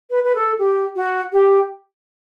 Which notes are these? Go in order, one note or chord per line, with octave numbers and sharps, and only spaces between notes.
B4
B4
A4
G4
F#4
G4